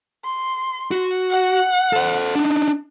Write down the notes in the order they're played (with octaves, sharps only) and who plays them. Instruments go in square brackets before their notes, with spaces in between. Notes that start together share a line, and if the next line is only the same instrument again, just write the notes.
[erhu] C6
[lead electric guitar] F#4
[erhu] F#5
[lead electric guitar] A4 C5
D4 D#4